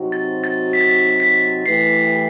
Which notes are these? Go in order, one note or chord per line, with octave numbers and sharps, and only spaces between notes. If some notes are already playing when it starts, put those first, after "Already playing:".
Already playing: C3 F#3 C4 D#4 F#4
A6
A6
B6
A6
B6
B6
E3 A3 E4 G4 B4 C7